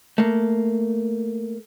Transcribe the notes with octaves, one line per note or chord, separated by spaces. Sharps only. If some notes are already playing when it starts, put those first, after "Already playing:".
A3 A#3